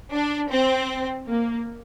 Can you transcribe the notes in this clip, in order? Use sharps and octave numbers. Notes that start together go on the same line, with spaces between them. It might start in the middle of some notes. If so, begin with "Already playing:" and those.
D4
C4
A#3